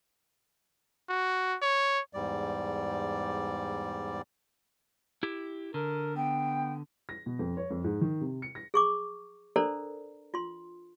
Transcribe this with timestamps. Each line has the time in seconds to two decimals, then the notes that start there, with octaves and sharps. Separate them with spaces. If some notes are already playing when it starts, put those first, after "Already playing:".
1.09 F#4
1.62 C#5
2.13 E2 G#2 G3 D5
5.23 E4 G4
5.74 D3 A#4
6.16 B3 G5
7.09 A#6
7.26 B2
7.39 F2
7.57 C#5
7.70 F2
7.84 G#2
8.01 D#3
8.21 C3
8.42 C#7
8.55 A#6
8.74 G#4 C#6 D6
9.56 D4 A4 A#4 C5 D5 A#5
10.34 F4 C6